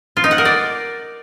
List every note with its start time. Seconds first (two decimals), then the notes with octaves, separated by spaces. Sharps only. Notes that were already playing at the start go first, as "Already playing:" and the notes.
0.17 F4
0.24 D#4
0.31 F#5
0.38 A#4
0.45 D5